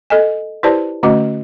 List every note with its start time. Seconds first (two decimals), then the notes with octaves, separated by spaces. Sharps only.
0.10 A4 D#5 G#5
0.63 E4 G4 B4 C5 D5 A5
1.03 D3 A3 C#4 F#4 D#5 D6